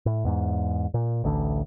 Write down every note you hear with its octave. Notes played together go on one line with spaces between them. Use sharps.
A2
E2 G#2
A#2
A1 D2 D3